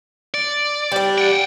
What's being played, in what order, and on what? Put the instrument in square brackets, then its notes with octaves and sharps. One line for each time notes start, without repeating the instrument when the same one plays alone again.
[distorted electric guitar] D5
[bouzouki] G3 D4
[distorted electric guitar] F#5 G5